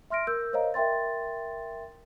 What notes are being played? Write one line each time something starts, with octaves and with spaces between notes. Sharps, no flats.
E5 C6 F6 A#6 D7
A#4 E6 G6
A#4 C5 C#5 D#5 F5 A#5
A#4 E5 G5 C6 A6